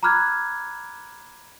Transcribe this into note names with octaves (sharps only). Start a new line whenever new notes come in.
A#5 B5 D6 F6 F#6 G#6